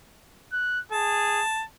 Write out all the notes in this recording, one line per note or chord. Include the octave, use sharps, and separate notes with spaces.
F#6
G#4 A5